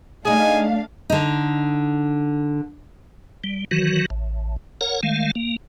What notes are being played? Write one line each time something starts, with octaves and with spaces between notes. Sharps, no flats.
A3 D4 D#4 G#4 F5 G#5
D3 D#4
G3
D#3 E3 F#3 F#4
A1
A#4 C#5 F#5 A#5
D#3 G#3 A3 F5
A#3